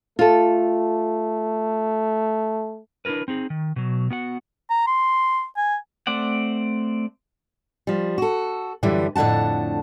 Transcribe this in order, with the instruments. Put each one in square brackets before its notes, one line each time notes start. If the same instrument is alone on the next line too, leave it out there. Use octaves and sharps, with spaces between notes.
[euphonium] A3 [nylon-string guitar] F4 A4
[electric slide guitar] D4 E4 F4 A#4 B4
C4 D#4 G#4
D#3
B2 F#3
B3 F#4 F#5
[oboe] A#5
C6
G#5
[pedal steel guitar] A3 C4 D5 F#5
[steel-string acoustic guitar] F3 G3
F#4 A4
F#2 D3 E3 G3
F2 A2 D3 F#5 A5